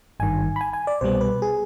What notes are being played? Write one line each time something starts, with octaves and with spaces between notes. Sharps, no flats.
G#1 G2 D#3 G#5
B5
G#5
G#5
D5
C2 B2 G3 B3 C5
B4
G#4